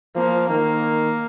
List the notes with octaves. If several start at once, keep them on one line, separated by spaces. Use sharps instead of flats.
F3 A#3
D#3 A#3